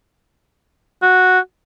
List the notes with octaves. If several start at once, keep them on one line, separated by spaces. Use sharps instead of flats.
F#4